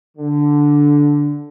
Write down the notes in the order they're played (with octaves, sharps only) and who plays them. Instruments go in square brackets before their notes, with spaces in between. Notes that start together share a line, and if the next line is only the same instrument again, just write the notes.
[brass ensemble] D3